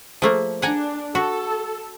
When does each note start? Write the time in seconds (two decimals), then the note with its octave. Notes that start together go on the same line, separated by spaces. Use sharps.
0.22 F3 A3 A#3
0.62 D4 F#5 G#5 A#5
1.15 F#4 A4